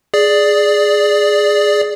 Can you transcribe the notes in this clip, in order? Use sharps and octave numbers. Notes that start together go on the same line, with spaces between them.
G#4 D5